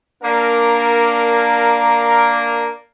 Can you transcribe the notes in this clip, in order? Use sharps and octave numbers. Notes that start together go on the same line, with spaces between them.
A#3 D4 A#4